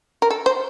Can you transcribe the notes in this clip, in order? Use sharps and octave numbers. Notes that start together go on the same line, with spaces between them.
A#4
A4
C5